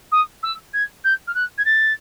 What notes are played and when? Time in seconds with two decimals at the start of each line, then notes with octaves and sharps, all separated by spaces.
0.12 D#6
0.43 E6
0.73 G#6
1.04 G6
1.27 F6
1.34 F#6
1.58 G#6
1.65 A6